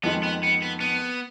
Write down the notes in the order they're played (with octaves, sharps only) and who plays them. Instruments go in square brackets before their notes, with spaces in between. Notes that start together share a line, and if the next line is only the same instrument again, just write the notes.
[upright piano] F2 D#3 G#3 [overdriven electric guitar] B3
[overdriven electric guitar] B3
B3
B3
B3